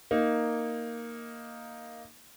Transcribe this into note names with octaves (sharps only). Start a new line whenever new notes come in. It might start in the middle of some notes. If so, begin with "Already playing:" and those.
A#3 D#4